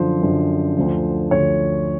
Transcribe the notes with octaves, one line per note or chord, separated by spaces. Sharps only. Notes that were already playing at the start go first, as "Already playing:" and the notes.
Already playing: F#2 D3 F3 C5
F#2 D3 F3
D2 D3 F3
D2 D3 F3 C#5